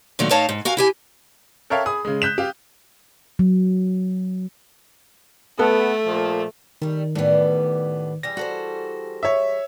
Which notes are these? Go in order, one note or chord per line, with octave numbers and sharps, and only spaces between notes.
A#2 D#3 F#3 A3
A2 D#4 C#5 F5 A5
G#2
F#4 A#4 F5 G#5
E4 G4 G#5
A4 A#4 C#5 E5 F5 G5
G#4 B5 D#6
C#3 G#3
F#6 G6 B6 E7
G4 F5
F#3
A3 B3 A4
A#2 F3
D#3 G3 A3
A2 E3 G3 B3 D4
E3 G3 G#4 A#6
F#4 A4 C5
C#5 E5